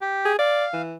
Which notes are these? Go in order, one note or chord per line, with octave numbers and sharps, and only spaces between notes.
G4
G#4
D5 F5
E3